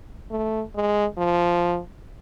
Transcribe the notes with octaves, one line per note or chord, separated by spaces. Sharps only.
A3
G#3
F3